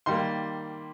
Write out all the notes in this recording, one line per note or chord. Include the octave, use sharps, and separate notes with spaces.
D#3 G3 A#3 C6